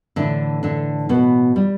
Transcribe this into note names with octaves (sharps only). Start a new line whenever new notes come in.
A2 D3 E3 D4
D3 D4
B2 B3
G3